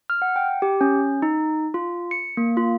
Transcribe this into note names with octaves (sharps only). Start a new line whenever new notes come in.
F6
F#5
G5
G4
C#4
D#4
F4
C#7
A#3
F4